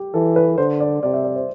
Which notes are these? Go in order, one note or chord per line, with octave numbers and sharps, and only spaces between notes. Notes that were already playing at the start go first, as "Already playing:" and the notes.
Already playing: G4
E3 A4
B4
D3 C5
D5
C3 D5
E5
D5
C5